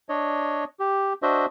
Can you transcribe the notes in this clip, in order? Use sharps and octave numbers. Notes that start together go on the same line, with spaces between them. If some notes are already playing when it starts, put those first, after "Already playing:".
D4 C#5 D#5
G4
D4 F#4 C5 D#5 E5